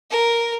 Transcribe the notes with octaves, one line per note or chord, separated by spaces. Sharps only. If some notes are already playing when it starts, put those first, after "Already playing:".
A#4